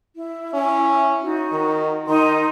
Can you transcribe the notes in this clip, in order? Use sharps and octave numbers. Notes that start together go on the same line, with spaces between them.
E4
C#4 E4
D#4 F#4
D#3
D#3 D#4 A#5 C6